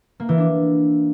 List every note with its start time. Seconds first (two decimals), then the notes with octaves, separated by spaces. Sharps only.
0.20 A#3
0.29 E3
0.38 D4